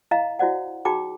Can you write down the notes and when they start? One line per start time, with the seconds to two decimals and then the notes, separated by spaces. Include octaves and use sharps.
0.11 E4 D#5 F5 A#5
0.39 E4 F#4 C5 D5 F#5
0.85 D#4 F#4 G#4 G5 A#5 D6